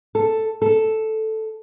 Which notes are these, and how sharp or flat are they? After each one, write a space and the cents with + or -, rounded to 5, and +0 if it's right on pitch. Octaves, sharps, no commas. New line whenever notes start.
A4 +5
A4 -5